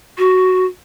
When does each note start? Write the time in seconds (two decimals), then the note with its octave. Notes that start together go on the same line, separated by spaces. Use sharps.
0.18 F#4